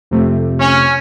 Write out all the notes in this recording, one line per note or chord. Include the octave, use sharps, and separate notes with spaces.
F2 C3 A3
C#4